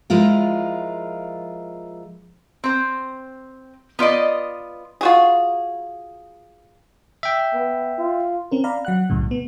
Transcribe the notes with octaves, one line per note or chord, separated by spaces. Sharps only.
F3 G#3 E4 F4 A#4
C4 C5
B3 F4 D5 D#5
F4 F#4 G#4
E5 G5
B3
F4
C4 C#4 A#4
D5 F5 A#5 B5
F#3 F#5 F#6
B1 F#2 A2 C#3
B3